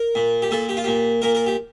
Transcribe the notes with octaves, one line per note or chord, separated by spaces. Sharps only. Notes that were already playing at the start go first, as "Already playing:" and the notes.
Already playing: A#4
A#2
G4
A#2 A4
G4
F4
A#2 G4
A#2 A#4
A#4
G4